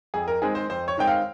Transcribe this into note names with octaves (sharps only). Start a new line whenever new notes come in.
F2 G#4
A#4
D#3 G#3 C4 G#4
C5
F2 C5
C#5
D#3 G#3 C4 G5
F5